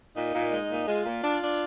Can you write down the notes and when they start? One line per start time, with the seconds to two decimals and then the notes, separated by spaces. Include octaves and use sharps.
0.15 A#2 D#4
0.34 A#2
0.52 G#3
0.70 A#2
0.88 G#3 F4
1.05 A#2
1.24 D4
1.42 D4